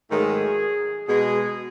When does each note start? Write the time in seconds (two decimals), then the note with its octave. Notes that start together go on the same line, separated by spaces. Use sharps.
0.11 G#2 D#3 F#3 A3 G#4
1.08 B2 G#3 G#4